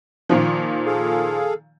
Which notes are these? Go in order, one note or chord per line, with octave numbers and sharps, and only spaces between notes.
A#2 D#3 F3
G#4 A4 F5